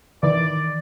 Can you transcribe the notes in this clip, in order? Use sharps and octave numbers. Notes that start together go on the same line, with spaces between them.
D#3 E3 D5